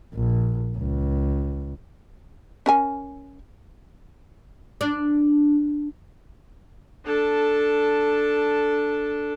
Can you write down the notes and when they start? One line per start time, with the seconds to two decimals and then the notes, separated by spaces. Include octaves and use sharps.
0.14 A#1
0.77 C#2
2.66 C#4 A#4 G#5
4.81 D4
7.06 D4 A4